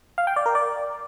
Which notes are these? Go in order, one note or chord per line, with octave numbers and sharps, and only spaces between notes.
F5
G5
D5
A#4
D5